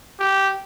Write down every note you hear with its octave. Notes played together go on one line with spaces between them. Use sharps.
G4